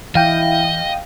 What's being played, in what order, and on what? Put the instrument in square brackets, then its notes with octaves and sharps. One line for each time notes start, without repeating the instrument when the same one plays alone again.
[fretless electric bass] E3 [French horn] E4 [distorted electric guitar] D#5 [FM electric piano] F5 G5